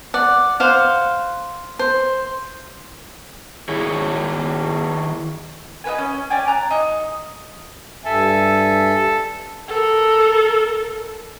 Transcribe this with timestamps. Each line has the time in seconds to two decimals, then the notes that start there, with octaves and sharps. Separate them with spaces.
0.14 D5 F#5
0.60 C5 F5 F#5
1.79 C5
3.69 D#3 E4 G#4 C#5
5.84 D#4 F#4 B4 G#5
5.98 C#4
6.30 C#4 D5 G5 G#5
6.48 A#5 D6 F#6
6.71 D#4
8.05 G2 A4 E5 G#5
9.68 A4 A#4